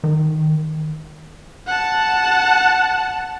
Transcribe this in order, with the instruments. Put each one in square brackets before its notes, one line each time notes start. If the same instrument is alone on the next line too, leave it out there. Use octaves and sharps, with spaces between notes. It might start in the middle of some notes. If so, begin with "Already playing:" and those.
[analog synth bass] D#3
[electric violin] F#5 A5